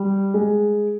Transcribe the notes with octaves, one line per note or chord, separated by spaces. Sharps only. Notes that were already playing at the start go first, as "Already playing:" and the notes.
Already playing: G3
G#3